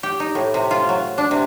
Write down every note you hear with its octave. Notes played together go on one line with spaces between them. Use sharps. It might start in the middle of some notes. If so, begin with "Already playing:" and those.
G4
D#4
A2
C3
F4
F#3
D4
C3